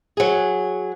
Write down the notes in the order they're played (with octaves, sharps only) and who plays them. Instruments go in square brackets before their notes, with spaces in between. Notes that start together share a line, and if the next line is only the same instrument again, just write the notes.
[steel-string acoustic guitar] F#3 G#4